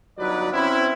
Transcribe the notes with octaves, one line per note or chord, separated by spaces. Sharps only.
G1 F#3 D#4 B4 D5
C4 C#4 E4